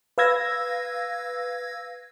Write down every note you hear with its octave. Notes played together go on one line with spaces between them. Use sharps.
B4 F5 E6 G#6 A#6